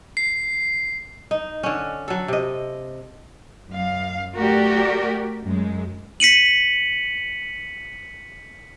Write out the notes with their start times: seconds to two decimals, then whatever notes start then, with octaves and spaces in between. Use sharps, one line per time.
0.17 C7
1.31 D#4
1.63 D3 C#4
2.08 F#3 A4
2.28 C3 D#5
3.70 F#2 F5
4.35 A3 F#4 G4 A#4 D5
5.43 F#2 G#3
6.20 B6 C#7 D#7 F#7